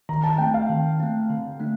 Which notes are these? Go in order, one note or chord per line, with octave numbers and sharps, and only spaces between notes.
D#3 A#5
A5
A3 C4 G5
F5
D#3
A3 C4
D3
A3 D4